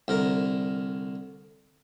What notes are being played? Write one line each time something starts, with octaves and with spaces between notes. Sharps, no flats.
C2 D3 A#4